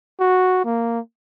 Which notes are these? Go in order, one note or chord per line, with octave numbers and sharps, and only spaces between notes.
F#4
A#3